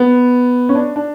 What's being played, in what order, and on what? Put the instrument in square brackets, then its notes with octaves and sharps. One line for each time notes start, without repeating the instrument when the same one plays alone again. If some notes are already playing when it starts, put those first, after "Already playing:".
Already playing: [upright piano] B3
C#4
D4
D4